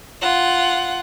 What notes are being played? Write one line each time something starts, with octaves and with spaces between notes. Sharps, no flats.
F4 F#5